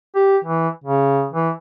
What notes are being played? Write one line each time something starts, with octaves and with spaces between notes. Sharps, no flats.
G4
E3
C#3
E3